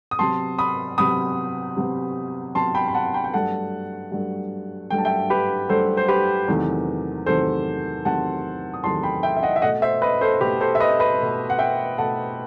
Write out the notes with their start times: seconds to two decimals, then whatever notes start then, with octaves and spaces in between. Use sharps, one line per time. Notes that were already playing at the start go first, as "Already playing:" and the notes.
0.11 D#6
0.19 C3 F#3 B3 A5 C6
0.59 B5 D#6
0.98 C3 F#3 B3 B5 D#6
1.77 C3 F#3 B3
2.55 C3 F#3 B3 A5 C6
2.75 G5 B5
2.88 B5
2.94 F#5 A5
3.14 G5 B5
3.24 G5
3.34 G2 F#3 A3 F#5 A5
4.12 G2 F#3 A3
4.90 G2 F#3 A3 G5
4.98 A5
5.05 E5 G5
5.30 G4 B4
5.69 G2 F#3 A3 A4 C5
5.97 C5
6.08 G4 B4
6.48 E2 C3 D#3 F#3 A3
7.26 E2 C3 D#3 F#3 A3 A4 C5
8.05 E2 C3 D#3 F#3 A3 F#5 A5
8.74 D#6
8.84 E2 C3 D#3 F#3 A3 A5 C6
9.03 G5 B5
9.23 E5 G5
9.36 E5
9.43 D#5 F#5
9.56 E5
9.62 B2 A3 D#5 F#5
9.82 C5 E5
10.02 B4 D#5
10.21 A4 C5
10.41 B2 A3 G4 B4
10.61 A4 C5
10.75 E5
10.80 B4 D#5
11.00 B4 D#5
11.19 B2 A3
11.50 F#5
11.59 E5 G5
11.98 B2 A3 F#5 A5